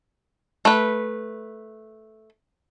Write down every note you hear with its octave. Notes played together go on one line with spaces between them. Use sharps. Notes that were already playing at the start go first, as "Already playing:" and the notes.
A3 B4